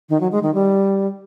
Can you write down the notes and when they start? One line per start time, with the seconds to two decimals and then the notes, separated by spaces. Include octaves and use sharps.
0.09 D#3
0.21 F#3
0.32 G#3
0.43 D#3
0.54 G3